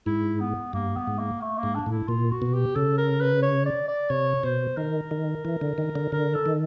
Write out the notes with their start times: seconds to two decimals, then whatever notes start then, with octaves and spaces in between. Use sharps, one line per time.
0.06 G#2 E4
0.40 B3
0.73 G2 A#3
0.97 B3
1.07 G#2
1.19 A#3
1.41 A3
1.58 A#3
1.63 G#2
1.75 D4
1.86 A2 E4
2.08 A#2 F4
2.31 F#4
2.42 B2
2.53 G4
2.75 C#3 A4
2.98 A#4
3.20 B4
3.42 C#5
3.66 D5
3.88 D5
4.09 C3 C#5
4.43 B2 C5
4.77 D#3 A#4
5.11 D#3
5.45 E3
5.61 D3
5.78 D#3
5.95 D3
6.12 D3 A#4
6.34 A4
6.46 D#3